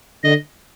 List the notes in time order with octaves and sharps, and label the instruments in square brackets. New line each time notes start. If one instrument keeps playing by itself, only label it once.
[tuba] D3 [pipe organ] D#5